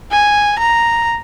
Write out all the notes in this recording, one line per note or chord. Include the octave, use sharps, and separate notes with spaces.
G#5
A#5